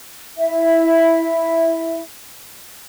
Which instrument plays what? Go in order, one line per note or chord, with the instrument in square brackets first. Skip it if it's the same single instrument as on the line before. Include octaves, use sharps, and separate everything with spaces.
[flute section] E4 E5